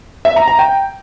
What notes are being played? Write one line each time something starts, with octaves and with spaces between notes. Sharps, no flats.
E5
A#5
A#5
G5